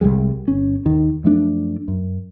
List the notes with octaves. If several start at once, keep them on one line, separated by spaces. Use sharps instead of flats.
C2 F#2 G3 G#3
G1 C#4
D#2 D#3
F#2 F3 A3 D4
F#2